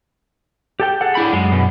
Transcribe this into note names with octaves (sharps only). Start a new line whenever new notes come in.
G4 A4 G5
G#4 A4 F#5
D4 E4 B5
F#2 G#3
B2